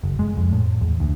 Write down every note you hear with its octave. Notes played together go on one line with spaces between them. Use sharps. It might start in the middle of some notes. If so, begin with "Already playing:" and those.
F#1
G#3
F2
A2
E2
D2